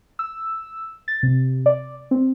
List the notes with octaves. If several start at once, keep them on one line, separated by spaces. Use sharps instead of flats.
E6
A6
C3
D5
C4